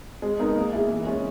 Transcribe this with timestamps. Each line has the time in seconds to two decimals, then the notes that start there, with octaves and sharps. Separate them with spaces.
0.22 G#3
0.39 B3 D#4 A#4
0.56 A#3
0.73 E4 G#4
0.90 E3
1.06 G#3 C#4